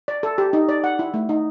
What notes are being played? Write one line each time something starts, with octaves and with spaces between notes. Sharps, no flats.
D5
A4
G4
D#4
D5
F#5
E4
A3
D#4